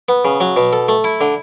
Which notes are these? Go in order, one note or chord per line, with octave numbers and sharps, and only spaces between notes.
B3
C#3
F#3
B2
A4
A3
E4
D3